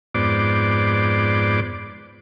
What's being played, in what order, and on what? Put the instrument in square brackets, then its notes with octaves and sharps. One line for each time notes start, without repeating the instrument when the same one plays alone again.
[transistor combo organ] F2 G#2 B3 C5 D5 D6